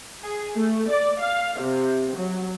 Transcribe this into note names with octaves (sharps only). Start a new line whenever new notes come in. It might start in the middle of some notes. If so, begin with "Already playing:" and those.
G#4
A3
D5
F5
C3
F#3